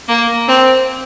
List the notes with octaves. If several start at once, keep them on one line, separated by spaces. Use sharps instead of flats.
A#3
C4